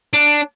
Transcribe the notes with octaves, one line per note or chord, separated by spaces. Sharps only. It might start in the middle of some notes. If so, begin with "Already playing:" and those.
D4